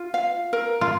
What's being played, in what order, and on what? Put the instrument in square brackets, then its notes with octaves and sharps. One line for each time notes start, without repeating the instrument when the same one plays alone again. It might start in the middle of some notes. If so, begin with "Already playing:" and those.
Already playing: [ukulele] F4
F5
A#4
[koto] F4